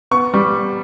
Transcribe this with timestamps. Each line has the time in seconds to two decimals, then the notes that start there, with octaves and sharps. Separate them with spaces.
0.11 B3 C#6
0.34 G3 C#6